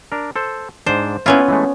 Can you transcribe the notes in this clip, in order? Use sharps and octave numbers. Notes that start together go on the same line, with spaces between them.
D4 A#4
A4 C5
G#2 D4 C5
A#3 B3 C#4 E4 F4
E3 G#3 A3